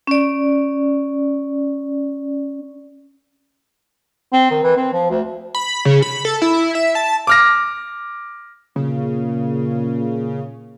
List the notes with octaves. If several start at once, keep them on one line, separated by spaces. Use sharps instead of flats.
C#4 D5
C4
D#3
E3
C4
F3
D2
B5
C#3
B5
A4
E4
E5
A5
D6 F6 A#6
A#2 C#3